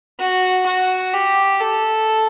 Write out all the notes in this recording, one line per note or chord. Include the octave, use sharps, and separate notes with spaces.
F#4
F#4
G4
A4